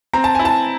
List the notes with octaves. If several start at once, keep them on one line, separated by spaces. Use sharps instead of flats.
C4 A#5
A5
E4 G#5
A5